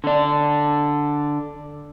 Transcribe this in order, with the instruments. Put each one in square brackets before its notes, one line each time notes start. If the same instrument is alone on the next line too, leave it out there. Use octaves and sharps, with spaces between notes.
[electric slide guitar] D3 D4